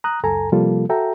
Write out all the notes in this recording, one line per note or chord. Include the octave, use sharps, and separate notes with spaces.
A#5 D#6 F#6
C#2 F#2 A4 G#5 A#5
C3 F3 G3 A#3 F4 A4
F#4 A4 E5 G5 A#5